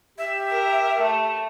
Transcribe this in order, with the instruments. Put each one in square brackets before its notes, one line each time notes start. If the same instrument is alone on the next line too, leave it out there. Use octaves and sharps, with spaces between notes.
[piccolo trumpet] G4 [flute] E5
[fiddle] A#4
A3